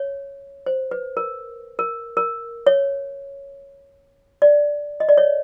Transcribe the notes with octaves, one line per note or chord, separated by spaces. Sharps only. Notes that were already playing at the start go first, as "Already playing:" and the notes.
Already playing: C#5
C5
B4
A#4
A#4
A#4
C#5
D5
D#5
D5
C#5